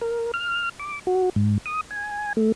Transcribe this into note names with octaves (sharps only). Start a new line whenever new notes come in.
A#4
F6
D6
F#4
G#2
D#6
G#5
A3